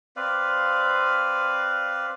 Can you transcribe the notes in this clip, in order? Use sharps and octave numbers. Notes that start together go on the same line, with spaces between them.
C4 B4 D5 F5